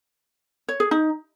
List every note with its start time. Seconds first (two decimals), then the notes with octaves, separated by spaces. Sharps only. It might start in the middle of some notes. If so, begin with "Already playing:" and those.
0.68 C#5
0.80 G#4
0.91 D#4